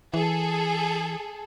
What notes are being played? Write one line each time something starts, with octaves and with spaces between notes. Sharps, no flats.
E3 G#4 A4